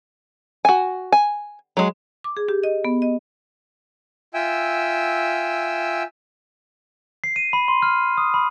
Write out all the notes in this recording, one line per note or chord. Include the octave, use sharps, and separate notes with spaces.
F#4 G#5
G#5
F#3 G#3
D6
G#4
G4
D#5
B3
D#5
F4 E5 G5 G#5 E6
C7
D#7
B5
C6
F6
D#6
B5